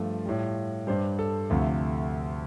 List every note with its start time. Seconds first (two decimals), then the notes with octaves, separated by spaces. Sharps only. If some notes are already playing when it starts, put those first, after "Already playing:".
Already playing: G2 F3 A3 F4
0.26 A2 G3
0.87 G2 G3 C5
1.19 A4
1.50 D2 C3 F3 A3